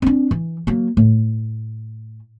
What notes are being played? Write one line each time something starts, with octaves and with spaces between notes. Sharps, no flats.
C4 D4
E3
F#3 A#3
A2